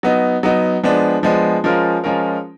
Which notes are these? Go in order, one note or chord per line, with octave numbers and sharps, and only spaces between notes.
F#3 B3 D#4
F#3 B3 D#4
F3 G#3 B3 D4
F3 G#3 B3 D4
F3 G#3 C#4 F4 A#4
F3 G#3 C#4 F4 A#4